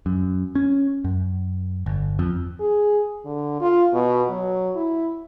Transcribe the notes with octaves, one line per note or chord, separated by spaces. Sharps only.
F#2
C#4
F#2
G1
F2
G#4
D3
F4
B2
F#3
E4